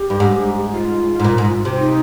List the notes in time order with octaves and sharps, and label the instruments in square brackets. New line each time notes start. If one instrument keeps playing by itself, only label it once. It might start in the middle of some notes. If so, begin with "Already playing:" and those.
Already playing: [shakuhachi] G4
[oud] G2
G#2
[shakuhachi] F4
[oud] G#2
A#2
G#2
C3
[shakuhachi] D#4